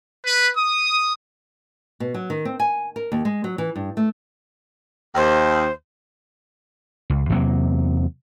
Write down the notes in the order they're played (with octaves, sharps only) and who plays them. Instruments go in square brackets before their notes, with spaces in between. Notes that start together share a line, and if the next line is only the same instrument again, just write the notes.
[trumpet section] B4
D#6
[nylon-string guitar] B2
F#3
D#3
C4
G#5
A#4
D#2
G#3
F#3
E3
G2
A3
[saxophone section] D#2 [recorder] C5
[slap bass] C#2
E2 C3 F#3 A#3